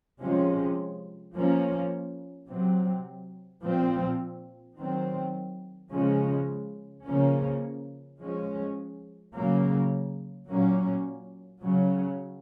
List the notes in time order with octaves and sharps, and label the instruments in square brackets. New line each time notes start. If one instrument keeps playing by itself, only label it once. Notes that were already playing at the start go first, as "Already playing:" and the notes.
[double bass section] C3 F3 G#3 C#4
F3 A#3 C#4
C3 F#3 C4
A#2 F3 C4
D#3 F#3 C4
C#3 F3 G#3 C#4
C#3 F3 A#3 C#4
F3 G#3 C#4
C#3 F#3 A#3
A#2 F#3 A#3 C#4
C#3 F#3 C#4